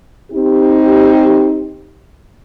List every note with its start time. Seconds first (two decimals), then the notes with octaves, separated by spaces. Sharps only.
0.31 C4 D#4 G4